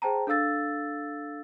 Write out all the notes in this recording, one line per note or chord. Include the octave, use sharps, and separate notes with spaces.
G#4 C5 G5 A5 A#5
D4 A4 F5 E6 A6